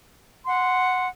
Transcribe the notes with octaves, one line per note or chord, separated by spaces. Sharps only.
F#5 C6